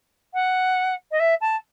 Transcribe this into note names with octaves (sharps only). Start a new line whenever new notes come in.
F#5
D#5
E5
A5